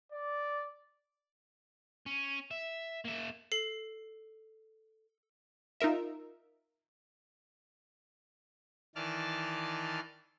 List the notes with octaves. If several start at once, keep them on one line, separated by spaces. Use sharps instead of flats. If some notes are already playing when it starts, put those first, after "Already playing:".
D5
C#4
E5
A#3 E5
A4 C7 F#7
D#4 F4 A#4 E5
D#3 E3 D5 A5 F6